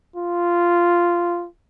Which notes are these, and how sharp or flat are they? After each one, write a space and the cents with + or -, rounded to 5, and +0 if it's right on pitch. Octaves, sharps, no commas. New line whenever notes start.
F4 -10